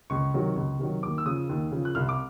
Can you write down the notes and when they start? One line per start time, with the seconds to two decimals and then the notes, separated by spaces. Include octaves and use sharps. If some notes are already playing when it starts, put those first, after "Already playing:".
0.10 C#2 C#6
0.34 C3 D#3 F#3
0.56 C#2
0.79 C3 D#3 F#3
1.03 D#2 D6
1.18 E6
1.26 C#3 F3 D#6
1.49 D#2
1.71 C#3 F3
1.85 F#6
1.95 C2 F6
2.09 D6